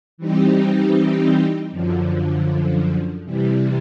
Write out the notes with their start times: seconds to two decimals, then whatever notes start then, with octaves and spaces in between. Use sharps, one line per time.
0.18 E3 G3 C4 D#4 G4
1.71 F#2 D3 F3
3.25 C3 E3 G3